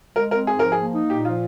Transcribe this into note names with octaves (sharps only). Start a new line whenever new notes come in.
G#3 A#4
C4 A#4
G#2 G#4
F3 A#4
G#4
A#3
D#4
A#2 G4
F3 F4